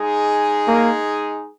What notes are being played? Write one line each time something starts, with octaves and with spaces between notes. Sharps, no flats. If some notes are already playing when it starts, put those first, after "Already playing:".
Already playing: G#3 D#4 G#4
A#3